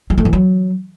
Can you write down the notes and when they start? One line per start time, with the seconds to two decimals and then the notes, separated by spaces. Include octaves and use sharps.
0.10 G#3
0.18 A3
0.25 E3
0.33 F#3